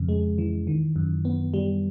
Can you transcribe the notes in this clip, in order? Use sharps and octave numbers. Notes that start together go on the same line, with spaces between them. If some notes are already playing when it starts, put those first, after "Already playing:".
Already playing: F2 C#3
G#3
E3
D#3
F#2
B3
G3